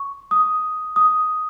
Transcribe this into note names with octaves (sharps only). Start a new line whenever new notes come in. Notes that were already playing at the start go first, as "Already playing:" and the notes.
Already playing: C#6
D#6
D#6